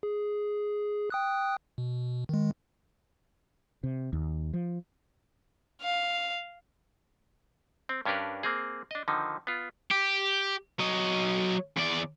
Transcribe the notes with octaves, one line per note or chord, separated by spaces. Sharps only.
G#4
G5 D#6 F#6
B2
D#3 G#3
C3
D#2
F3
F5
C4
G2 C#4 D4 G4 A#4 B4
A#3 C4 G#4
D4 D#5
D3 D#3 F3 D#4
B3 F4
G4
F#3 D#5
E2 D5